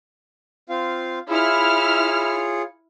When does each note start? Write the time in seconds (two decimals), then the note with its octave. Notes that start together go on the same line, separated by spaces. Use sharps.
0.69 C4 F4 F5
1.29 E4 F4 G#4 C#5 F6